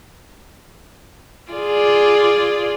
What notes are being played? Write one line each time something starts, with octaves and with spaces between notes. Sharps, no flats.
F4 G#4 D5